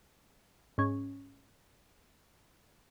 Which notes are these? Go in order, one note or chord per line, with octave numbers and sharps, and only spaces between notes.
G#2 C#4